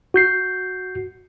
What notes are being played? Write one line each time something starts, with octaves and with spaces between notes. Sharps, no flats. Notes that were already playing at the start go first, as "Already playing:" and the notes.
F#4 G6 C7